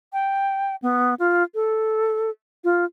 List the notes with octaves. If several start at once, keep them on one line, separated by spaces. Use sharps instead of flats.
G5
B3
F4
A4
F4